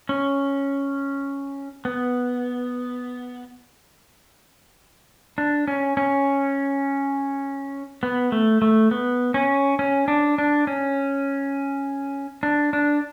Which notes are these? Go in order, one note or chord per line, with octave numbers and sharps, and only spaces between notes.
C#4
B3
D4
C#4
C#4
B3
A3
A3
B3
C#4
C#4
D4
D4
C#4
D4
D4